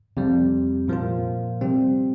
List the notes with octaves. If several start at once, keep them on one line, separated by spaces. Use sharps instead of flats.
F2 C3 G3
A#2 F3 A#3 F4
C3 G3 C4